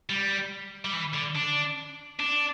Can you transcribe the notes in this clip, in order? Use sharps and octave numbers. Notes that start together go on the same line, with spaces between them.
G3
G3
E3
D3
D4
D4